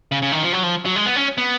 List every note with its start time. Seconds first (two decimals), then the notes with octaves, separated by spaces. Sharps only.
0.12 C#3
0.22 C#3
0.32 D#3
0.43 F3
0.53 F#3
0.63 F3
0.85 F#3
0.96 G#3
1.06 B3
1.16 C#4
1.38 B3